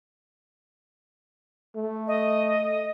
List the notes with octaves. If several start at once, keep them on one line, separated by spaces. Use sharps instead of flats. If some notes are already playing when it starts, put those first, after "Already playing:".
A3
D#5